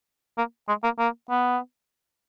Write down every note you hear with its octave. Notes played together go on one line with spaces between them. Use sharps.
A#3
G#3
A#3
A#3
B3